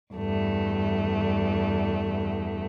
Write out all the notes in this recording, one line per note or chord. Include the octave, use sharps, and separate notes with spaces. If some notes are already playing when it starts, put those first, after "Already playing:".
E2 G2 A3